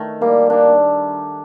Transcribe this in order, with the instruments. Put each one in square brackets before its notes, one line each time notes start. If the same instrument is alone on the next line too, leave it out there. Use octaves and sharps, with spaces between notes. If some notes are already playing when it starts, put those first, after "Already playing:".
Already playing: [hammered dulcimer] D#3 A3
[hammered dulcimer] G3 [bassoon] A#3
[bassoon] A#3 [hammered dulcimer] D4